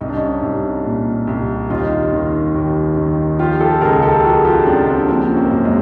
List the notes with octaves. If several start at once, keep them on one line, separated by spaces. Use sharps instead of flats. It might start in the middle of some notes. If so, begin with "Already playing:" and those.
C2 D#4
D4
C#4 D#4
C2
A#2
C2
D#2 D#4 F4
D#3
D#2
D#3
F3 F4 G4
G4 A4
C#2 G#4 A#4
G4 A4
F3 F#4 G#4
F4 G4
C#2 C4 D4
C4 D4
F3 A#3 C4
C#4
A#3 C4
F#2
G#3 A#3